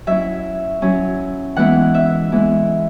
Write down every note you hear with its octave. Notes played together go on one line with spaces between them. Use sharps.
F#3 C#4 E4 E5
F#3 C#4 E4
E3 G#3 B3 E4 F#5
E5
E3 G#3 B3 E4